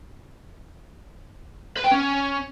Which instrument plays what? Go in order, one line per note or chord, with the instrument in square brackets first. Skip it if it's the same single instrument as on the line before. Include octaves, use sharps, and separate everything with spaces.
[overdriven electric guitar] B4
G5
C#4